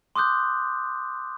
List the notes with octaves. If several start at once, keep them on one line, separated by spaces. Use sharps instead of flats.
C6 D6 D#6 F#6 G6